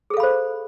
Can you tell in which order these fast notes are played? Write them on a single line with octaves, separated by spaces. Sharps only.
G#4 A4 F5 B5 C5